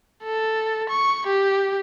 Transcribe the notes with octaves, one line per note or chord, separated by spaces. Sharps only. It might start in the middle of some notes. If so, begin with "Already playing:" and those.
A4
C#6
G4